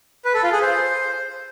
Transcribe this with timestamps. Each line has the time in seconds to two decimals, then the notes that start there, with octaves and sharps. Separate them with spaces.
0.25 B4
0.34 A4
0.43 F4
0.52 G#4
0.62 C5